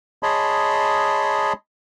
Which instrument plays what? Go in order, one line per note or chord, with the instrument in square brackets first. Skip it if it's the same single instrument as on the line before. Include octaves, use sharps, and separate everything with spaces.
[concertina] G#4 C#5 D#5 A5 B5 C6